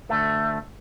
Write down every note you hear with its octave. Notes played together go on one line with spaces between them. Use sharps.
D2 A3